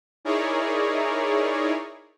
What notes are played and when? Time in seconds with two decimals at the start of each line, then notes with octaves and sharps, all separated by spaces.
0.25 D#4 E4 G#4 A#4 C#5 D5